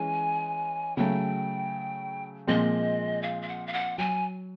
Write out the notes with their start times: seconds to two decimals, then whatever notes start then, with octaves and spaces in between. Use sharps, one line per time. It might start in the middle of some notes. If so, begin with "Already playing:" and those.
Already playing: E3 G#3 C#4 G#5
0.97 C#3 F#3 A3 G5
2.47 A#2 F3 G#3 C4 D#5
3.23 F5
3.42 F5
3.49 F#5
3.67 F5
3.73 F#5
3.98 F#3 G#5